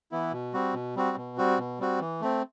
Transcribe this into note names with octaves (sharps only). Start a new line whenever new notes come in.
E3 B3 E4
B2
G3 C4 F#4
B2
G3 C4 F#4
B2
G3 C4 F#4
B2
G3 C4 F#4
E3
A3 C4